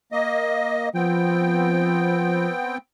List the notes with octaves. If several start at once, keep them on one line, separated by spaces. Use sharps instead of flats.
A#3 D#5
F3 B3 C4 G5